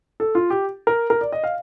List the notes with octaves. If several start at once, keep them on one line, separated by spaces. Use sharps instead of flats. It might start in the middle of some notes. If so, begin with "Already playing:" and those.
A4
F4
G4
A#4
A#4
D5
D#5
F5